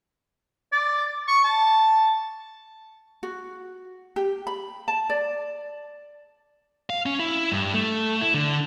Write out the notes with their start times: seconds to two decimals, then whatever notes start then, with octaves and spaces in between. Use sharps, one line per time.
0.72 D5
1.28 C#6
1.44 A5
3.23 F#4
4.16 G4
4.47 B5
4.88 A5
5.10 D5
6.90 F5
7.06 C#4
7.19 E4
7.52 G2
7.74 A3
8.21 E4
8.34 D3